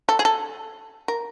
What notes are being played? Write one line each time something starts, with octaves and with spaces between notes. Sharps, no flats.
A4
G#4
A4
A#4